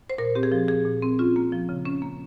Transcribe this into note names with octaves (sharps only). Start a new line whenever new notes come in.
C5
A#2 A#4
C4 G4
G#4
F3
A#2 G#4
A#2
C4
C#4 F4
A#3
F3
C#3
C#4
A#3